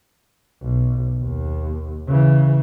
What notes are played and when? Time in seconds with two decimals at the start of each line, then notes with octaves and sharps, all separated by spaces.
0.62 B1
1.21 D#2
2.07 C#3 E3